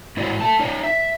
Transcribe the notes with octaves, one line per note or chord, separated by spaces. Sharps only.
G#2 E4 F#4 D5
A3 A5
D#4 C#5 D5
E5